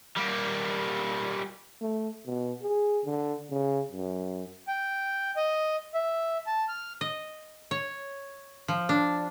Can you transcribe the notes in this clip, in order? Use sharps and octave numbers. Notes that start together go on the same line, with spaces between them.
G3 A#3
A3
B2
G#4
D3
C#3
F#2
G5
D#5
E5
A5
F6
D#5
C#5
F3
D4